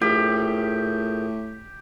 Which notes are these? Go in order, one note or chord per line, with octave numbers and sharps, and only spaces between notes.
A2 F4 G4 G#4 A#4